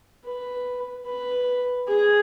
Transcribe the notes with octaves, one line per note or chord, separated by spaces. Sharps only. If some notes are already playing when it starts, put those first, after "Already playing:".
B4
B4
G#4